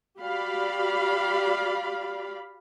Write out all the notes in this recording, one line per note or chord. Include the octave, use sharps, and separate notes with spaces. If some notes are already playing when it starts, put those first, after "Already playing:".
F#4 G4 D5 F5 B5